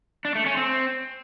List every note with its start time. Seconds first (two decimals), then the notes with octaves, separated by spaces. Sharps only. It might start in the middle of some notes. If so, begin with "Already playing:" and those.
0.25 D4
0.35 A3
0.46 C#4
0.57 C4